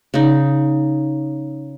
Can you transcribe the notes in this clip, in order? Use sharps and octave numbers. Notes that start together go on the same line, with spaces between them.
C#3 D#4